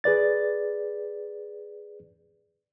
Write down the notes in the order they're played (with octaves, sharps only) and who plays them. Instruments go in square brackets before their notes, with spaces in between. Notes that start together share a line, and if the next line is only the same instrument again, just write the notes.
[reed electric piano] G#4 B4 D5 A6